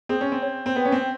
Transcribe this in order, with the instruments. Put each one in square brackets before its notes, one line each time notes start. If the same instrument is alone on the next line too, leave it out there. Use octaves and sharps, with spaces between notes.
[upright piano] C4 [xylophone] G#4
[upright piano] C#4
C4
[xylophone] C#5
[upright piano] C4
[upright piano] B3 [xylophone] G5
[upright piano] C#4
C4